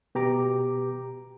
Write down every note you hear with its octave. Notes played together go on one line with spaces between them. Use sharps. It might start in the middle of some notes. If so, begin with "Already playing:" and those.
B2 G4 A#5 D6